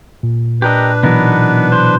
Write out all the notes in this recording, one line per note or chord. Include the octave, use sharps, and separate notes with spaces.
A#2
D4 G4 A#4 B4 D#5
B2 E3 F#3 B3 D#4 A#4
C5